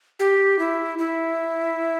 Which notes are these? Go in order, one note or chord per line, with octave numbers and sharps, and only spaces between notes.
G4
E4
E4